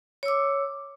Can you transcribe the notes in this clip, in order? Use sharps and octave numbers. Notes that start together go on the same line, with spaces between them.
C#5 D6 E6